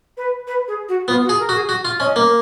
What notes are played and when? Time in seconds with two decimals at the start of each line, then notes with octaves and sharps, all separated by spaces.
0.17 B4
0.47 B4
0.67 G#4
0.88 F#4
1.08 B3 F4
1.24 F#4
1.29 G#4
1.39 A#4
1.49 F#4
1.54 G#4
1.69 F#4
1.85 F4
2.00 C#4 D#5
2.16 A#3